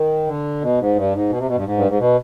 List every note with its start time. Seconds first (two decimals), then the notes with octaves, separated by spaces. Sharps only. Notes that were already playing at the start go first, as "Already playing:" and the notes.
Already playing: D#3
0.27 D3
0.61 B2
0.79 G#2
0.95 G2
1.13 G#2
1.30 B2
1.38 C3
1.47 B2
1.55 G2
1.65 G#2
1.77 G2
1.88 G#2
1.99 B2